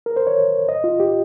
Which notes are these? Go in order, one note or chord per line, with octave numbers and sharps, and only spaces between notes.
A#4
C5
C#5
D#5
F4
G4